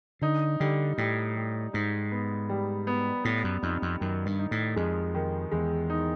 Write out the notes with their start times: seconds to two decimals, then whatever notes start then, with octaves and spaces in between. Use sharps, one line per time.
0.22 D3 D#4
0.60 D3 G3
0.98 A2 G3
1.36 G3
1.73 G#2 D#4
2.11 B3
2.49 G3
2.87 B3
3.24 A2 B3
3.44 F#2
3.62 F2 D#4
3.82 F2
4.00 F#2 D#3
4.26 G2
4.39 D#4
4.51 A2
4.76 F2 G#3
5.15 D#3
5.52 E2 G#3
5.90 D#4